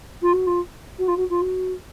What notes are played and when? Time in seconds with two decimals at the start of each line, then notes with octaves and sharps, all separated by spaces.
0.22 F4
0.33 F#4
0.46 F4
0.98 F#4
1.07 F4
1.17 F#4
1.30 F4
1.41 F#4